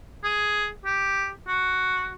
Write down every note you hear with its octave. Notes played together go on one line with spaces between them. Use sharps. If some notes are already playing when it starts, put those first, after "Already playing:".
G#4
G4
F#4